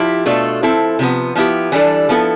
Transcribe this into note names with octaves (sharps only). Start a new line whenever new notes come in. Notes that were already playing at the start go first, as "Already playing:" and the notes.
Already playing: F3 E4 G4
B2 A3 D4 F4 A4
F3 C4 E4 A4
C3 F3 B3
F3 B3 E4 G4
E3 G3 D4 A4
F3 B3 E4 A4